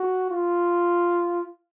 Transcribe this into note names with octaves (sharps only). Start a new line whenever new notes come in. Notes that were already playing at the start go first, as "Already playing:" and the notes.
Already playing: F#4
F4